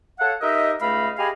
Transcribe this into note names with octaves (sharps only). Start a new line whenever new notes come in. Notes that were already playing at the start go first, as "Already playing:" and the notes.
A4 C#5 F5 F#5
D#4 G4 A#4 D#5 E5
C#2 A3 D#5 F5 B5
G4 G#4 D#5 F5 G#5 B5